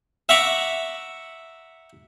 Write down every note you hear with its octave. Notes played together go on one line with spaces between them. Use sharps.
E5 F#5 A#5 B5 C#6 D6